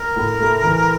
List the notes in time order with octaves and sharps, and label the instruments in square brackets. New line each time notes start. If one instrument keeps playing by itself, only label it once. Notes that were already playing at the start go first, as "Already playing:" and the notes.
Already playing: [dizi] A#4
[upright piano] A2
A3
E3